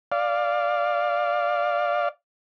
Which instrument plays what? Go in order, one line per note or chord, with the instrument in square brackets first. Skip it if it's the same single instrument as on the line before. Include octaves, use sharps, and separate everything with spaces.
[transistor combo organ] D5 F5